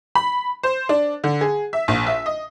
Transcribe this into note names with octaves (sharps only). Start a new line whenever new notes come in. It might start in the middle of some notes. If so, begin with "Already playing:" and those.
B5
C5
D4
D3
G#4
E5
A#1
E5
D#5